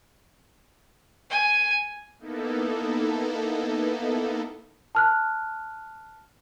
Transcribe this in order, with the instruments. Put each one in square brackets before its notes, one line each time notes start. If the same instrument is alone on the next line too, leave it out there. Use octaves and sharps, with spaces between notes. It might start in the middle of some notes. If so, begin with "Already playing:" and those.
[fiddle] G#5
[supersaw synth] A#3 B3 D#4 E4 A4
[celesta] A5 F6 F#6